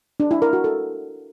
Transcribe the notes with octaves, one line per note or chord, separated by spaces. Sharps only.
D4
E4
A#4
F#4
A4